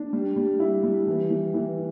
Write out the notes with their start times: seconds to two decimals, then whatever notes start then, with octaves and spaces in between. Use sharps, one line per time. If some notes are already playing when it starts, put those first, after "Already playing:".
Already playing: D4
0.13 G3
0.36 G3
0.60 E4
0.83 G3
1.07 E3
1.30 E3
1.54 E3